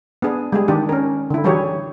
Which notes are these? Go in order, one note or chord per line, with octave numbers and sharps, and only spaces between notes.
B3 D4 G#4
G3 G#3 G#4
D#3 D4 G4
C#4 A#4
D3 E4
E3 F#3 G3 G4 G#4 C#5